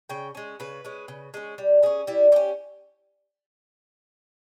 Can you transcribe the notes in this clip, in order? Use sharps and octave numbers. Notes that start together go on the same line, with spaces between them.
C#3 G5
G#3 C#4
C#3 B4
G#3 C#4
C#3
G#3 C#4
G3
C#4 E4 G#4
G3 E4
C#4 E4 G4